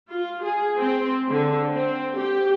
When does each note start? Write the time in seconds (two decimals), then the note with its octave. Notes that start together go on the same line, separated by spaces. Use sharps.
0.11 F4
0.44 G#4
0.78 C4
1.30 D3
1.71 C4
2.19 G4